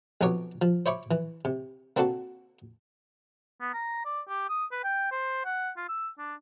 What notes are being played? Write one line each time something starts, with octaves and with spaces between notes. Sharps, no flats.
B1 F2 B2 D#4 C#5 D6
F3
C5 C#5 E5 B5 C#6 D6
E3
C3
A#3 C4 D4 F#4 A4
B3
A#5
D5
G4
D#6
B4
G5
C5
F#5
F4
E6
D4